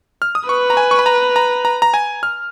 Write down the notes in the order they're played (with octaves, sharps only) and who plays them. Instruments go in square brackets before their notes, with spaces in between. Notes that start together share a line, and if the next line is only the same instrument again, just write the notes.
[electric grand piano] F6
D#6
[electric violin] B4 [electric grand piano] C#6
[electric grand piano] A#5
G#5
C#6
B5
A#5
A#5
A#5
A#5
G#5
F6